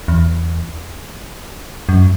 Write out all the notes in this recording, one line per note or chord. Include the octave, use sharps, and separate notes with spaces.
E2
F#2